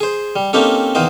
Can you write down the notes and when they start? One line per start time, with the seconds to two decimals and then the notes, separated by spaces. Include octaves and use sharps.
0.01 G#4 C5
0.36 G3
0.53 A#3 C4 C#4 D#4 G4 A4
0.95 E2 D#3 A#3 C5 D#5